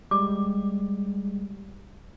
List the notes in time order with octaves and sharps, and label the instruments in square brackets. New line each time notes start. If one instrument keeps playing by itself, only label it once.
[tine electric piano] G3 G#3 [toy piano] D6